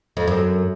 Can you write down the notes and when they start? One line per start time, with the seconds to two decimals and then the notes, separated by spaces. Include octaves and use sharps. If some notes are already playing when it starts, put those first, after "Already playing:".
0.17 F2
0.27 F#2